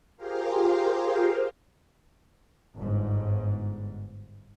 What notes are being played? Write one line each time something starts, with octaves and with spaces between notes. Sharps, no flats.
F4 G4 G#4 A#4 C5 F5
G1 G#2